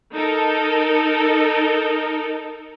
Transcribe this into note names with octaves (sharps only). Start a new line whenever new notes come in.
D#4 A4 A#4